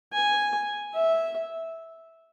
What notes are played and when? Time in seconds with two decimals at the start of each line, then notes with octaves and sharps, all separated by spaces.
0.13 G#5
0.93 E5